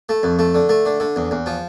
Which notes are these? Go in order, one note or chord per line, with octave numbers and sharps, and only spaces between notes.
A3
F2
A3
D3
A3
D3
D3
E2
E2
F3